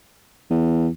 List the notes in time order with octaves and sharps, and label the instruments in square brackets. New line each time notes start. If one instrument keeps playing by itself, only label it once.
[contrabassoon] E2